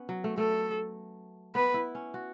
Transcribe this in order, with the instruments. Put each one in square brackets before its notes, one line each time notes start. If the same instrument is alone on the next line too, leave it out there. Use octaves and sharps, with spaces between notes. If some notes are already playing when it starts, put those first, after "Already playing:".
Already playing: [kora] B3 C#4
F#3
A3
[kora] A3 [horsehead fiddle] A4
[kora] B3 [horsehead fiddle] B4
[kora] E4
C#4
F#4